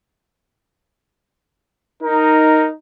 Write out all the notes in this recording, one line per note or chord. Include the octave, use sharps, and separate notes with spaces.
D#4 A#4